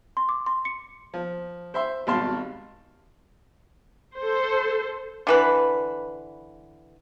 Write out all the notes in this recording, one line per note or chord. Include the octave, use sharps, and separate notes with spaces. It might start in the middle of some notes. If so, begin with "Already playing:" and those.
C6
D6
C6
C#7
F3
C5 E5 C6
G#1 B2 G3 F5 A5 C6
A4 C5
D3 E3 B4